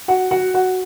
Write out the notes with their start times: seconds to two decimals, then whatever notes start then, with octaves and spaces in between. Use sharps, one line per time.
0.08 F#4 F#5
0.31 F#4 F#5
0.54 F#4 F#5